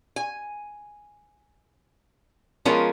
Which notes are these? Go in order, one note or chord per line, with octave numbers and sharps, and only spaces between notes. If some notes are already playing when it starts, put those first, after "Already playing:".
G#5
F3 G#3 B3 C#4 F4 A#4